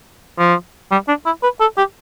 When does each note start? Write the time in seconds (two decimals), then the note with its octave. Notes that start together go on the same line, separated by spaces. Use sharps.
0.38 F3
0.92 G3
1.08 D4
1.26 E4
1.43 B4
1.61 A4
1.78 G4